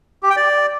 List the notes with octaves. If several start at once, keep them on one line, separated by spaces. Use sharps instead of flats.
G4
G5
D5